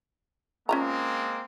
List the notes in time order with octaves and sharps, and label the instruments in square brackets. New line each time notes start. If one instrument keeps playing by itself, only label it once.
[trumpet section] G#3 A#3 C4 [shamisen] C#4 F4 A#5